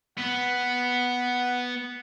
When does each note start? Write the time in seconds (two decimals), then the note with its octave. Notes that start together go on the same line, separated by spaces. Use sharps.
0.18 B3 F#5